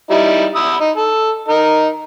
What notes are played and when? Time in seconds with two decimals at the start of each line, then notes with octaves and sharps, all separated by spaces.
0.10 G3 D#4 E4
0.55 B5 D#6 E6
0.80 D#4
0.97 A4
1.48 D#4 A#4